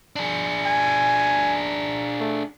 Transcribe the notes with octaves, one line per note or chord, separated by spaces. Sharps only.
D4 G#4
G#5
A3